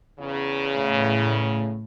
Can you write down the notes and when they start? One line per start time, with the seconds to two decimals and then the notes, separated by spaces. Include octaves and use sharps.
0.19 E2 C#3
0.78 A2